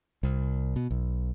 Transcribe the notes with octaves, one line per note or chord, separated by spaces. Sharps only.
C2
B2
B1